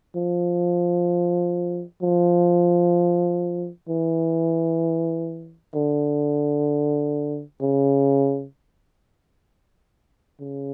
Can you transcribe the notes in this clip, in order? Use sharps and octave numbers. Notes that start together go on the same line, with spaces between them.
F3
F3
E3
D3
C#3
C#3